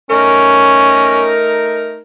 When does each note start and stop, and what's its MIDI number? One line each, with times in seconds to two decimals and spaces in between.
0.10 2.01 57
0.10 1.30 61
0.10 2.01 63
0.10 2.01 70